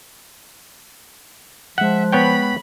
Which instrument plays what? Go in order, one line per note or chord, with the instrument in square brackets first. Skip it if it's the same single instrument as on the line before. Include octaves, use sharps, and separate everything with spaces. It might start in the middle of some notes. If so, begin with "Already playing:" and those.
[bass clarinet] F3 [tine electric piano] G#3 F#6 [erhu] E5 [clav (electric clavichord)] F#5
[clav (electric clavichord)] B3 C#5 G5 [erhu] B5